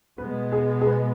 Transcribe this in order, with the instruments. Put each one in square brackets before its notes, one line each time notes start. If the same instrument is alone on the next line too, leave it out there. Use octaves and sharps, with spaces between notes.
[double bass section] B2 G#3 B3 [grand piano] B4
[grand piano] G#4
G#4
B4